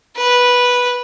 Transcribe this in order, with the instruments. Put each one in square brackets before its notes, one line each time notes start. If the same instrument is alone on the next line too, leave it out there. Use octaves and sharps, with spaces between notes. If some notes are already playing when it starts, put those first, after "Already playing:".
[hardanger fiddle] B4